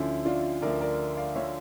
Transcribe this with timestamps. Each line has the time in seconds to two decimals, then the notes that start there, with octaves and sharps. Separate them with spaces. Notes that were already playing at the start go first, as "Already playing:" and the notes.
Already playing: D2 D3 F3 C#4 E4
0.25 D4 F4
0.62 D2 D3 F3 A#4 D5
0.81 A#4 D5
1.17 D5 F5
1.35 D3 F3 C#5 E5